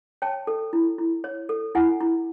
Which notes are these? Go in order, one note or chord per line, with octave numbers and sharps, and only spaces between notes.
C#5 G5 A5
A4
E4
E4
C#5
A4
E4 F#5 G#5
E4